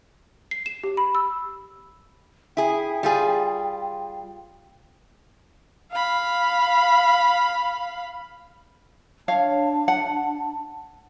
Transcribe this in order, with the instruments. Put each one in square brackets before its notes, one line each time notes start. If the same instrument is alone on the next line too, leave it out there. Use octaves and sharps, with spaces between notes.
[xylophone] C7
E7
G4
B5
E6
[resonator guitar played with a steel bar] E4 G#4 [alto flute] G5
[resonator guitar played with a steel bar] G3 F4 G#4
[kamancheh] F5 B5
[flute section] D4 A5 [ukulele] C#5 F5
[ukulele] F#5